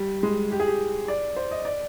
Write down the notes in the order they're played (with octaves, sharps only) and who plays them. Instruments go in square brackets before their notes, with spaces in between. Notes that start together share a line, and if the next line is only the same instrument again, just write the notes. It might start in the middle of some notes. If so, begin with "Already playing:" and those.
Already playing: [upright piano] G3
G#3
G4
G#4
G4
D5
C5
D#5
D5